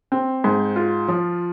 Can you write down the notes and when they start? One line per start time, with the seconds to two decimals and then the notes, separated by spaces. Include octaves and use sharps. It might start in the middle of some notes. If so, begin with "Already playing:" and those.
0.12 C4
0.44 G#2
0.76 F4
1.08 F3